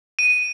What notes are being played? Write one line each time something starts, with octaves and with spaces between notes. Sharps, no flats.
D#7